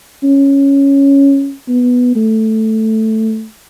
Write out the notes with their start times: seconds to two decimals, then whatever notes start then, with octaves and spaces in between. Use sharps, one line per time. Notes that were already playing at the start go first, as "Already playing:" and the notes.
0.23 C#4
1.68 B3
2.16 A3